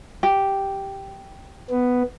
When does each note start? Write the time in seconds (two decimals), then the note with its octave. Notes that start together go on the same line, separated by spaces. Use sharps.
0.23 G4
1.70 B3